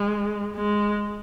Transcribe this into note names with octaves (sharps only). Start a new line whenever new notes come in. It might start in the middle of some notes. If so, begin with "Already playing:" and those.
Already playing: G#3
G#3